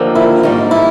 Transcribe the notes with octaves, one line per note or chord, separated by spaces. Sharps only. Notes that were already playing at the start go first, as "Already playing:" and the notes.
Already playing: D#2 D3 F3 A#3
E4
G#2 D#3 G3 A#3 D#4
E4